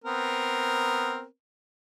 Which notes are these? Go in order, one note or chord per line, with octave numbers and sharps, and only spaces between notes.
B3 C4 A#4